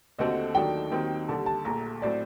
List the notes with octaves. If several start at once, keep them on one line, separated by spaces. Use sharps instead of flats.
D#2 D3 A3 C4 F#4 D#5
D#2 D#3 F#3 A3 D4 G5
D#2 D#3 F#3 C4
D#2 D3 G3 A5
A5
A#1 A#2 A3 A#5
A2 F#3 C4 D5